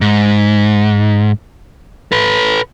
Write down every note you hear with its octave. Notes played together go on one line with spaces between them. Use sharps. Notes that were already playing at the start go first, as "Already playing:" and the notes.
G#2
A4 B4